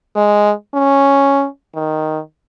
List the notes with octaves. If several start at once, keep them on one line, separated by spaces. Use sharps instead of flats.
G#3
C#4
D#3